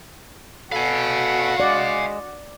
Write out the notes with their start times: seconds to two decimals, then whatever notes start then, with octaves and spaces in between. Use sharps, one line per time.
0.72 B2 F#4 A4 F5 G#5 B5
1.60 G#3 D5